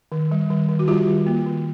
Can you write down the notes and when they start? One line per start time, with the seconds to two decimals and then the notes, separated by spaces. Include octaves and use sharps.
0.12 D#3
0.31 G3
0.50 D#3
0.69 D#3
0.79 F#4
0.88 G3 F4 G4
1.07 D#3
1.27 A#3
1.46 D#3